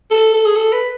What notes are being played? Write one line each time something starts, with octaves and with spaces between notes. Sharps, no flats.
A4
A4
G#4
A4
B4